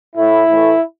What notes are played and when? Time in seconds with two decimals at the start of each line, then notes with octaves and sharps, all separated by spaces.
0.16 A2 A3 E4
0.48 A2 E3 A3